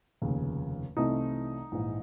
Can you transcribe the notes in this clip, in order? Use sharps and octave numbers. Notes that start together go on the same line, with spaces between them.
F1 D#2 C#3
C2 C3 E3 A3 C4 D#4
A#1 G#2 E3